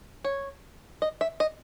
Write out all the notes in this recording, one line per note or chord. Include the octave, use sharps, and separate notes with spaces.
C#5
D#5
E5
D#5